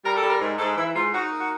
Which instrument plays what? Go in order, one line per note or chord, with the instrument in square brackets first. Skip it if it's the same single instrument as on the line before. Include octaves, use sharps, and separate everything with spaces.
[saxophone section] G3 A#4
A4
G3
A#4
G#2
G#2 A4
E3 E4
G#2 F4
D#4 F#4
A#3
F#4